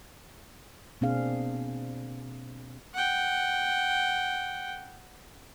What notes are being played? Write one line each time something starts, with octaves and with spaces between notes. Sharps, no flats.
B2 A#3 C4 D4 G#4 F5
F#5 G5